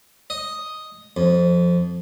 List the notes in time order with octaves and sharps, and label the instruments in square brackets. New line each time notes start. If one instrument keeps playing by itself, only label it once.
[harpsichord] D#5
F2